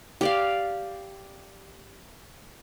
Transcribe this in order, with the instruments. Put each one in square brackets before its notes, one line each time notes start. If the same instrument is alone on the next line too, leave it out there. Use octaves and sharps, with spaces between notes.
[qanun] G4 D5 F5